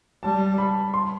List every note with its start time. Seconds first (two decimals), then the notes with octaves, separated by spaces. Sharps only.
0.23 G3 A5
0.58 B5
0.94 C6